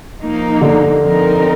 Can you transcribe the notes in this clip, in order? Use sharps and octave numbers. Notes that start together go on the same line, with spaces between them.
F3 A#3 D#4
D3
F3 C4 D#4 A#4